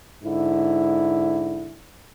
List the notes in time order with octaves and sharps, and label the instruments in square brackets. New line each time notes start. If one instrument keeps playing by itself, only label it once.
[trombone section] G#2 D3 E4